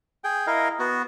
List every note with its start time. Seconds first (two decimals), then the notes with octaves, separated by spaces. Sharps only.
0.24 G#4 G5
0.47 E4 A#4 D#5 F5
0.79 B3 F#4